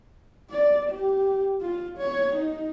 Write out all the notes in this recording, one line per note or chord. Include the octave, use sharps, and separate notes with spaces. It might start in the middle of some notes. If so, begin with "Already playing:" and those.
D5
G4
F4
C#5
D#4